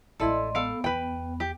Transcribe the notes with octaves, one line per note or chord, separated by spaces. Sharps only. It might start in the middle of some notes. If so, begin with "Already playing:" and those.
A1 G#3 E4 A4 D5 D#5 C6
B3 A4 F5
E2 B4 G5
G4